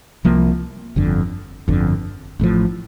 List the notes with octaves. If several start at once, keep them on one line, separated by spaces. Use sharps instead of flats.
C2 C3 F3 A#3
G1 F2 D3
G1 F2 D3
A1 A2 F3